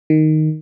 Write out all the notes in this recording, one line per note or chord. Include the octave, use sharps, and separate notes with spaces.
D#3